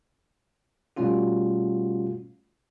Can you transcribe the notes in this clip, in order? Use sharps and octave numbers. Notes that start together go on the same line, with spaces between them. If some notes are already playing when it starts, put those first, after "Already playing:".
B2 G3 A3 C#4 F4 F#4